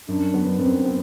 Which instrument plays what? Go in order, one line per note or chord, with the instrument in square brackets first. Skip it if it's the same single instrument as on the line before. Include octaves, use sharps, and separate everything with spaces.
[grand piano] F#2 [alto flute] D4
[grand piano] F#3 B3
[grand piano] F#2 [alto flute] C4
[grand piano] B3